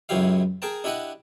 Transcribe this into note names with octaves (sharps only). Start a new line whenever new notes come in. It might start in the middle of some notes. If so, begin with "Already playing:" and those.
C#2 F#2 F#3 E4 G4 F5
G#4 A#4 G5 A5
D4 E4 G4 D#5 F#5